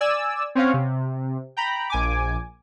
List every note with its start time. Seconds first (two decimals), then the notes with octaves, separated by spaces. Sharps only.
0.01 D5 G#5 E6
0.55 C4 C#4 C#5 F5 F#5
0.74 C3
1.57 G5 A#5 B5
1.90 A#1 G#5 D6